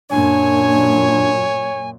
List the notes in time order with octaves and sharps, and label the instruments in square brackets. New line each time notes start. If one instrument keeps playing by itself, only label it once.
[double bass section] F#2 A#2 [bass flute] D4 [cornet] C#5 [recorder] G#5